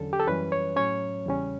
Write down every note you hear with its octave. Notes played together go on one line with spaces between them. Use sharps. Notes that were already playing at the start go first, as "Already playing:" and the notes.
Already playing: E2 D3 F#3 C#4 A4
G4
A4
F#2 E3 G3 C#4 B4
C#5
A2 F#3 C#4 C#5
E2 C#3 G3 C#4